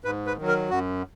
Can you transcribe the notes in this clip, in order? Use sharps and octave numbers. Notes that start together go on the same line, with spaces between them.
G#2 B4
B4
D#3
F#3
A#4
F#2 F#4